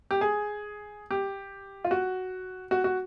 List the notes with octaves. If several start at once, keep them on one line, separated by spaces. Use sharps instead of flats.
G4
G#4
G4
F4
F#4
F#4
F#4